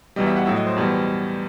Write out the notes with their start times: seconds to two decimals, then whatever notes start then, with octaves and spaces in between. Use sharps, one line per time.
0.16 E2 B2 G3 D#5
0.26 E5
0.37 F#5
0.46 A2 F#3 E5
0.56 D#5
0.66 C5
0.76 E2 B2 G3